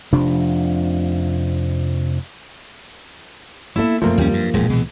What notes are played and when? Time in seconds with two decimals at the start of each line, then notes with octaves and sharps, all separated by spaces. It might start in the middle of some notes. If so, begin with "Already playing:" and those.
0.12 F1 C3 F3 D4
3.76 A#3 B3 E4 A4 E5
4.02 F#2 D3 F3 A3 A#3 C4
4.18 D#2 G3 C#4
4.33 G2
4.54 E1 C#2 G2 A#2 G#3
4.70 B2 E3